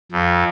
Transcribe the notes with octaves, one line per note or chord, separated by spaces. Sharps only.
F2